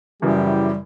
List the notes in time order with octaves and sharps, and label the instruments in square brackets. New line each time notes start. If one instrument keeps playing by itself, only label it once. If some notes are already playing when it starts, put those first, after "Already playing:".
[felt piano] F#2 C#3 E3 [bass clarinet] G3 [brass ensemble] E4 F#4 G4